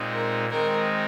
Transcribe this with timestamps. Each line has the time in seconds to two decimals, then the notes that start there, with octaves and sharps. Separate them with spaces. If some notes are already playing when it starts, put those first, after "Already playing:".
Already playing: A#2 G#3 C4 D#4
0.13 A#4
0.49 D#3 G#3 C4 D#4 A#4